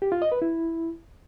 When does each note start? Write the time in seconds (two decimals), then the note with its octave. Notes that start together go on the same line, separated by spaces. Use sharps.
0.02 G4
0.12 F4
0.22 D#5
0.32 B4
0.42 E4